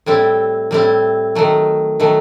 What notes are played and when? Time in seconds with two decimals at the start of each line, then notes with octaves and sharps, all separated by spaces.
0.06 A2 G3 C4 E4
0.71 A2 G3 C4 E4
1.35 D#3 F#3 A3
2.00 D#3 F#3 A3